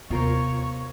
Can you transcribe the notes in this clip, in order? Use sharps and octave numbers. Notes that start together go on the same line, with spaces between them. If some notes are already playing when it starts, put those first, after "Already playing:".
D#2 C3 B3 F4 A#4 C5 C#5